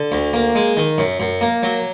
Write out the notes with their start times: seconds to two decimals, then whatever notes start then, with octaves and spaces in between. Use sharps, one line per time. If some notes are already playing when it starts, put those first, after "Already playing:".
Already playing: D3
0.12 D2
0.34 A#3
0.55 G#3
0.77 D#3
0.98 F#2
1.20 F#2
1.41 A#3
1.63 F#3